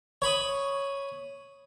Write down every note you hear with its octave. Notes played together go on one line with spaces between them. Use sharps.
C#5 B5 D#6